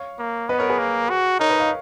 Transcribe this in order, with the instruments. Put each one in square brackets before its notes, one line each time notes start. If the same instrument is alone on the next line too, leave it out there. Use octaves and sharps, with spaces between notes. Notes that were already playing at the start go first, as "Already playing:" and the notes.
Already playing: [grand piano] C#5 F5
[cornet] A#3
[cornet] B3 [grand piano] B4 D#5
[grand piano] A#4 C#5
G#4 B4
[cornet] A#3
F#4
[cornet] D#4 [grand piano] A#4 C#5
[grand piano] B4 D#5
C#5 F5